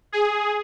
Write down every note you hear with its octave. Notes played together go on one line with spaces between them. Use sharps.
G#4